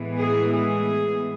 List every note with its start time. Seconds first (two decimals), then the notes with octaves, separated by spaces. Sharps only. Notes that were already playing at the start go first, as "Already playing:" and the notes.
Already playing: A2 E3 G#3 B3
0.16 G#4
0.53 G#4